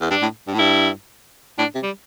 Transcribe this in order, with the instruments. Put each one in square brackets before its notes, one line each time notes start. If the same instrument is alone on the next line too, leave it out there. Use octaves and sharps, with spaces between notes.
[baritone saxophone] E2
[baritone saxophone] G2 [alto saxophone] D4
[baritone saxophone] A2
G2
A2
[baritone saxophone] G2 [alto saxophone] E4
[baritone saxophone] A2 [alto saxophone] D4
[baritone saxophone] C3
[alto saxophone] G3